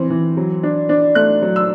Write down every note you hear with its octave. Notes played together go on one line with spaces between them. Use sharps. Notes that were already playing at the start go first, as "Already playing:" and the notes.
Already playing: E3 C4
E3
F#3
D4
D4
A3 F#6
F#3
E6